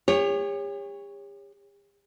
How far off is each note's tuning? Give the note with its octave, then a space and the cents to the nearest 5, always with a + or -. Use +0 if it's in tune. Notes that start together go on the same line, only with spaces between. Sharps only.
G4 +45 C#5 +0